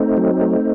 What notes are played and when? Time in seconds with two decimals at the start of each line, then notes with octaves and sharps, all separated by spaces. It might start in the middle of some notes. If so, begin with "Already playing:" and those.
Already playing: A3 C4 D#4
0.17 F#3
0.41 A3